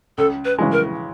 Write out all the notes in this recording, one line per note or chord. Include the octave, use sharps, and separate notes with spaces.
C#2 A4
B4
C#3 E3 G#3
A#4